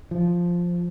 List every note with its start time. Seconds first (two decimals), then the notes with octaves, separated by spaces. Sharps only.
0.11 F3